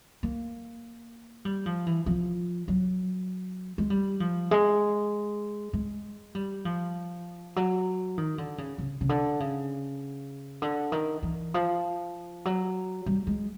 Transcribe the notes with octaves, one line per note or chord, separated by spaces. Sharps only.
A#3
G3
F3
E3
F3
F#3
G#3
G3
F3
G#3
G#3
G3
F3
F#3
D#3
D3
C#3
C#3
C#3
D3
C#3
D3
D#3
E3
F3
F#3
G3
G#3